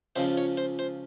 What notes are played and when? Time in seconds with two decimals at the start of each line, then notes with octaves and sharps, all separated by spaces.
0.16 C#2 C#3 F3 C5
0.38 C#5
0.57 C5
0.79 C5